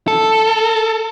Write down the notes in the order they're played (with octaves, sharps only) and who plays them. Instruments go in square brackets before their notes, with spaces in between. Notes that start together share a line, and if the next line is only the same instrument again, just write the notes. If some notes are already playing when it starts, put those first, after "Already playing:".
[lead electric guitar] A4